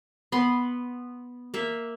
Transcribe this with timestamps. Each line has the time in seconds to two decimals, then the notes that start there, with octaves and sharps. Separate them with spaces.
0.32 B3 C6
1.54 A#3 E5